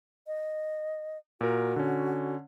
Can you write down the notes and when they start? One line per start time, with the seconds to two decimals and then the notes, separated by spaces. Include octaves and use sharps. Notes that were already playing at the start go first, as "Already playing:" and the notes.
0.27 D#5
1.41 A#2 F#4 A#4
1.76 D3 C#4